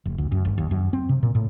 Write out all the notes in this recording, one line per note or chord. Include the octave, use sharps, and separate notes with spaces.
F1
D2
F#2
G1
D#2
F#2
C4
C3
A#2
A2